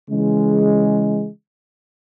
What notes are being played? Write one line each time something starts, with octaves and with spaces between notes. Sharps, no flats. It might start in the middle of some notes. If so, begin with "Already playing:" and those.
C#3 E3 G#3